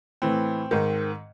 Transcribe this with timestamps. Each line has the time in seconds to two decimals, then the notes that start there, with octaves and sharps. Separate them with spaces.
0.22 A2 E3 C4
0.71 G#2 D#3